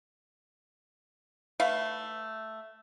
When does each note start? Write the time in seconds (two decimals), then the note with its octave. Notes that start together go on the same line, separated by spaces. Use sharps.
1.60 A3 B4 F5